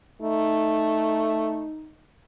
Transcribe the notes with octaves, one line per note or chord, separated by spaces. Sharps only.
A3 D#4